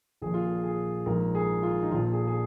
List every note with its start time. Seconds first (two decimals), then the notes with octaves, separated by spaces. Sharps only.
0.22 A#1 A#2 F3 G#4
0.34 F4
0.47 G#4
0.64 G#4
1.06 A#1 G#2 F3 A#4
1.35 G#4
1.63 F4
1.83 D#4
1.91 A#1 A#2 F3 F4
2.13 G#4
2.27 G#4